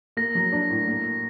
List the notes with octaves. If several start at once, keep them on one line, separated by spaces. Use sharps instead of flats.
A#3 A#6
F#3
D4
A2
A#3